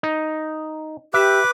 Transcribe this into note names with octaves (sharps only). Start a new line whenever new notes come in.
D#4
G4 B4 E5 D6